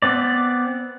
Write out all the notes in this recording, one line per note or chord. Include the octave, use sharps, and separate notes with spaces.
B3 C4 D5